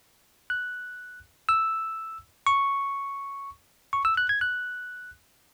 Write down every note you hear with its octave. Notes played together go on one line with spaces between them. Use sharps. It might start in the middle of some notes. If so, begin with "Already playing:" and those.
F#6
E6
C#6
C#6
E6
F#6
G#6
F#6